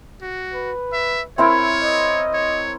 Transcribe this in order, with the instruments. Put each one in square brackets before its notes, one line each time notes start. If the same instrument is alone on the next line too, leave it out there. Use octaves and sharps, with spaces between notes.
[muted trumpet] F#4
[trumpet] B4
[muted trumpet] E5
[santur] C4 E4 A#4 [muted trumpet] C#5 [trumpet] E5
[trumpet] D#5
[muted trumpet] C#5